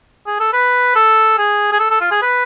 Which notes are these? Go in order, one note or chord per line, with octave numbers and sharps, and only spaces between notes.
G#4
A4
B4
A4
G#4
G#4
A4
A4
F4
G#4
B4